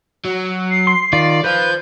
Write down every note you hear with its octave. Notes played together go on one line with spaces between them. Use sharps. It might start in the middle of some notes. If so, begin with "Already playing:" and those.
F#3
C7
C6
D#3 F4 D5
B4 C5 F5 G6